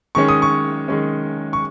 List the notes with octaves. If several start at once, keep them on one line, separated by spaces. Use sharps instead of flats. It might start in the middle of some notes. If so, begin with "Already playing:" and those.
D#3 G#3 C#4 C#6
D#6
C#6
D#3 G#3 C#4
C#6